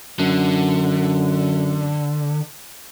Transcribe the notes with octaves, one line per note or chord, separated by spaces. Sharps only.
F#2 D3